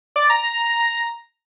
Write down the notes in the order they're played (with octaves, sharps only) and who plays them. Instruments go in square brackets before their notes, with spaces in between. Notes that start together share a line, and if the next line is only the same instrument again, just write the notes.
[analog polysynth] D5
A#5